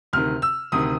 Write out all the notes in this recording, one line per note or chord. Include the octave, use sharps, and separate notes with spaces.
D2 C3 D#3 F6
E6
D2 C3 D#3 D#6